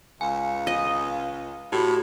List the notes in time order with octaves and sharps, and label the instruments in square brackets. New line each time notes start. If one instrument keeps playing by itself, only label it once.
[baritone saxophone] C#2 [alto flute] F5 [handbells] G#5
[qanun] D#5
[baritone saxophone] A2 [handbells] F#4 G4